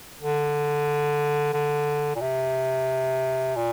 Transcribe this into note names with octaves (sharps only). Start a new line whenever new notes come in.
D3
D3
A#2
C3
A#2